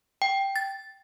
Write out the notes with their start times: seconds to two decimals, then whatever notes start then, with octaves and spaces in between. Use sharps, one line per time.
0.22 G5
0.56 A6